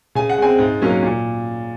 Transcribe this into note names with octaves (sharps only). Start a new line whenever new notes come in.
C#3 G#5
F#5
G#3 C4 G#5
G#2
F#3 A#3 C#4
A#2